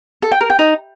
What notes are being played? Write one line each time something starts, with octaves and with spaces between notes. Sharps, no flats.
A4
G5
A#4
G5
D#4